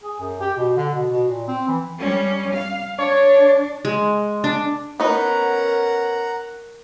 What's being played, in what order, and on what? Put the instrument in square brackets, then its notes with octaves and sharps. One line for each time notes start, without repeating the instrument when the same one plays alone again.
[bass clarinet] G#4
F#2
G4
B2
D3
B2
B2
A#2
C4
E3
[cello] G3 C#4
F5
[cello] D4 [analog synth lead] C#5
[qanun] G#3
D4
[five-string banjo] B3 D#4 [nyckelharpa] C#4 A#4 [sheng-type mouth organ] F#5 A#5